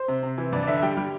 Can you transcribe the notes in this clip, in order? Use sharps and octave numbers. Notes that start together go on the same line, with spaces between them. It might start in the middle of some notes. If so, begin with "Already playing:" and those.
Already playing: C5
C3
C3
E3
G2 D5
D5
D3 E5
E5
G3 G5
G3